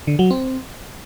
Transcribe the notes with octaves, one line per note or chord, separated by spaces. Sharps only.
D3
F#3
C4